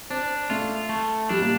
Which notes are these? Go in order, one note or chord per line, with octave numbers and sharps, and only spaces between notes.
C4 D4
A3 F4
A3
G3 D4
A#3